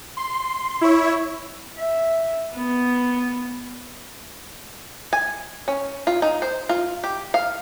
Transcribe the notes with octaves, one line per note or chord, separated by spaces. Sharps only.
C6
E4 C#5
E5
B3
G#5
C#4
F4
D#4
C5
F4
G4
F5